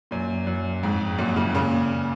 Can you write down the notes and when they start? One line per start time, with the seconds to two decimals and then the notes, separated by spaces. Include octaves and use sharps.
0.11 F#2 A#2
0.47 F#2
0.83 F2 G#2
1.18 F#2 A#2
1.36 A#2 C#3
1.55 A#2 C#3